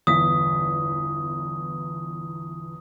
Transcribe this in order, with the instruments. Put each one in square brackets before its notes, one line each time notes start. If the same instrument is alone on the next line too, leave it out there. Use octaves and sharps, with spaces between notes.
[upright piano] G1 E2 B6 [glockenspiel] D#6